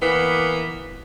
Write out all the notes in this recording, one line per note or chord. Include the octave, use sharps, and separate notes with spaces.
E3 A#3 B3